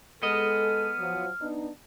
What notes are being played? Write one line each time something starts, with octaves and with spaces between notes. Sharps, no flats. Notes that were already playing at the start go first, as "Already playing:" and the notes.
G#3 B3 A4 D#5 F6
F3 F#3
B3 D4 D#4